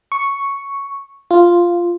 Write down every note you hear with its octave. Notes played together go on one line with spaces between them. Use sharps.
C#6
F4